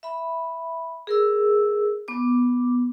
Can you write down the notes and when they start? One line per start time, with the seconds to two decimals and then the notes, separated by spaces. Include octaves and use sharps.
0.03 E5 B5
1.07 G#4 A#4 E6
2.08 B3 D6